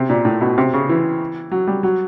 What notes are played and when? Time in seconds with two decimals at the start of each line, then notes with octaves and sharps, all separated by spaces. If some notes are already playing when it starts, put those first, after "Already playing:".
Already playing: C3
0.09 A#2
0.25 A2
0.41 B2
0.58 C3
0.73 C#3
0.89 E3
1.51 F#3
1.67 G3
1.83 F#3